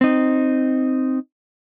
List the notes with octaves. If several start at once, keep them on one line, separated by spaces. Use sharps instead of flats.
C4 D#4